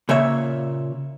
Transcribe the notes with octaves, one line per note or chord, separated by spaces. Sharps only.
A#2 C#3 C#5 E5